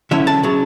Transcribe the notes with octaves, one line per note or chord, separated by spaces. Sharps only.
D3 F#3 C#4 E4 E5
A5
C#3 F#3